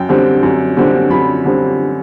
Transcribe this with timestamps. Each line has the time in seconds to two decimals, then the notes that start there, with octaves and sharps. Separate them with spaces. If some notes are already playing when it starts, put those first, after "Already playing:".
Already playing: F#2 G5
0.09 D3 G3 C4
0.43 F#2
0.77 D3 G3 C4
1.10 F#2 B5
1.45 D3 G3 C4